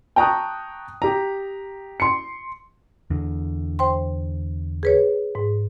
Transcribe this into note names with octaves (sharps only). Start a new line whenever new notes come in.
G5 A5 A#5 C#6 D#6 F#6
G4 A#5
C6 C#7
E2 D3
C5 G5 C6
G#4 B4 C#5
G#2